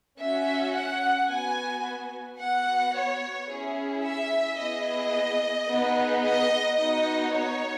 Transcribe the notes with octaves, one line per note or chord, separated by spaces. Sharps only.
C#4 F#4 E5
F#5
B3 F#4 G#5
B3 F#4 F#5
C#5
C#4 E4 G#4
E5
B3 E4 G#4 D#5
B3 D#4 G#4
D#5
B3 D#4 F#4 D#5
C#5